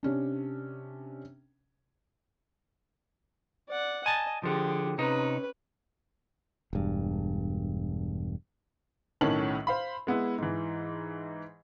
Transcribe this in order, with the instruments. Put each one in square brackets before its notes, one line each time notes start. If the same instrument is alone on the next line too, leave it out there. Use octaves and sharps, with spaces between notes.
[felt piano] C3 C#4 D4
[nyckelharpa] D5 F#5
[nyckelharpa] D#5 [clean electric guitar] G#5 A5
[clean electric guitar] D3 F3 [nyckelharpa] G4 G#4
[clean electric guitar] C3 D#4 [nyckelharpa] C#4 B4
[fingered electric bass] E1 G2
[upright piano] B1 A2 D#3 C#4 A5 F#7
C5 F5 B5
G#3 B3 E4
G#2 E3